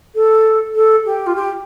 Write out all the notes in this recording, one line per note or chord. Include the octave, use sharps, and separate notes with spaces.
A4
A4
G4
F4
G4